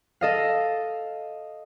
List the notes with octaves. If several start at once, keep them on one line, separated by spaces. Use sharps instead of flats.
A4 D#5 F5